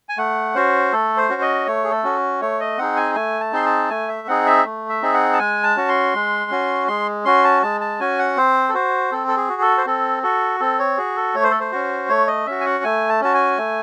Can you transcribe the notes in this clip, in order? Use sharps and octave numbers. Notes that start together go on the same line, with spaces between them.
G#5
A3 F#5
C#4 F#4 C5
A3 A4
C5
C#4 F#4
D#5
A3 C#5
G#4
A4
C#4 F#4
A3 C#5
D#5
C4 D#4 G#4 F#5
G#5
A3 G#5
A5
C4 D#4 G#4 C6
A5
A3 G#5
E5
C4 D#4 G#4 F#5
E5
A3
E5
C4 D#4 G#4
F#5
A5
G#3 G#5
A5
C#4 F#4
C6
G#3
C#4 F#4
G#3 C6
C#4 F#4 C6
A5
G#3 A5
A5
C#4 F#4 G#5
F#5
C4 C5
A4
F#4 C5
C4 A4
A4
G#4
F#4
A4
C5
C4 A4
F#4 A4
C4 A4
C#5
F#4 G#4
A4
A3 C#5
C5
A4
C5
C#4 F#4
A3 C#5
D#5
C#4 F#4 E5
G#5
F#5
A3 G#5
A5
C#4 F#4 A5
G#5
A3